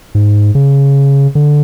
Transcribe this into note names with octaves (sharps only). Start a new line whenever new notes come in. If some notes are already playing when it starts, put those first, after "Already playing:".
G#2
C#3
D3